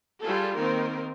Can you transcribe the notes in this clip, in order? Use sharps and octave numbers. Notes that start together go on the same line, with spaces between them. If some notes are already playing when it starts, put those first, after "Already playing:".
G3 F4 G#4 A4
D#3 A#3 C4 D#4 A#4